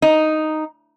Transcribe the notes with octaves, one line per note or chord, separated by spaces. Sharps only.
D#4